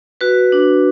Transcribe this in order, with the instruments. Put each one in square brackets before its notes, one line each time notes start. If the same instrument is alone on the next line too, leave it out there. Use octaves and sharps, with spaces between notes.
[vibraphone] F#4 B4
D4